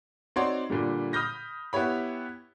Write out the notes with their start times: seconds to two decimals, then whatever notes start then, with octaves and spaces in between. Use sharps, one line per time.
0.36 C4 D#4 F#4 C#5 D5 C6
0.70 A#2 D3 G3
1.13 B5 D#6 F6 G6 A#6
1.73 B3 E4 G4 C#5 B5